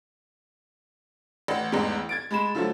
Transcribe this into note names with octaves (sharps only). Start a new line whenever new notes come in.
A1 F#5
A1 E2 G#2
G#6 A6 D7
G#3 B5 E7
D3 F3 F#3 A3